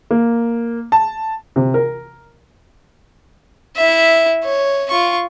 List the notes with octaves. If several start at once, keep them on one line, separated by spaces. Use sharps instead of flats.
A#3
A5
C3
A#4
E4 E5
C#5
F4 C#6